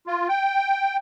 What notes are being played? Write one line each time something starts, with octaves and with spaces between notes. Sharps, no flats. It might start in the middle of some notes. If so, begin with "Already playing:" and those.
F4
G5